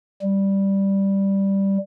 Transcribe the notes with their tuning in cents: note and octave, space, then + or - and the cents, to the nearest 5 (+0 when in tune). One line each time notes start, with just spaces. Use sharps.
G3 +0